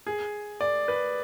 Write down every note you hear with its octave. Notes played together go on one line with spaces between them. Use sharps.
G#4
D5
B4